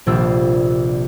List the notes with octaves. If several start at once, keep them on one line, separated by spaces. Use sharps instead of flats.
D#1 A#1 C3 D4 F4 E6